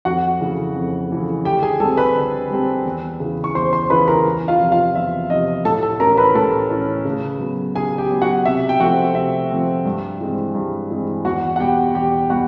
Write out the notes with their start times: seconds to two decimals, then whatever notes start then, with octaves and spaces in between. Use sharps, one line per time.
0.05 F2 F#4 F#5
0.40 C#3 E3 A3
0.75 F2
1.10 C#3 E3 A3
1.45 D3 G4 G5
1.63 G#4 G#5
1.80 G3 C4 A4 A5
1.97 B4 B5
2.15 D3
2.50 G3 C4
2.85 E2
3.20 C#3 E3
3.44 C#6
3.55 E2 C5 C6
3.73 C5 C6
3.90 C#3 E3 B4 B5
4.08 A#4 A#5
4.25 E2
4.48 F4 F5
4.60 C3 F3
4.72 F4 F5
4.95 E2 E5
5.30 C3 F3 D#5
5.65 A2 A4 A5
5.83 A4 A5
6.00 E3 A3 C#4 A#4 A#5
6.17 B4 B5
6.35 A2 A4 A5
6.70 E3 A3 C#4
7.05 C#3
7.40 F#3 B3
7.75 C#3 G#4 G#5
7.98 G4 G5
8.10 F#3 B3
8.22 F#4 F#5
8.45 C3 E5
8.69 G5
8.80 F3 A3 C4 F#4 F#5
9.15 C3 E5
9.50 F3 A3 C4
9.85 G2
10.20 E3 G#3 C4
10.55 G2
10.90 E3 G#3 C4
11.25 E2 F#4 F#5
11.56 F#5
11.60 B2 G3 B3 G4 G5
11.95 E2 G4 G5
12.30 B2 G3 B3 F#4 F#5